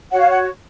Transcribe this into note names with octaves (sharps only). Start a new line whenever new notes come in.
F#4 C#5 F#5
F5
F#5